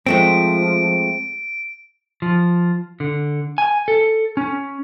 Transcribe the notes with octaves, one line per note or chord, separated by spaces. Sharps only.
F3 G#3 A3 C4 D7
F3
D3
G#5
A4
C#4